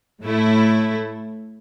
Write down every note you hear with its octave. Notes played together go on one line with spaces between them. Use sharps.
A2 A3 E4